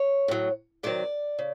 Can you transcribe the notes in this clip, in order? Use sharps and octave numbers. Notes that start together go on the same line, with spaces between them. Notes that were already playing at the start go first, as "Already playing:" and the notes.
Already playing: C#5
A2 F#3
C3 D#3 F#3 D5
C#3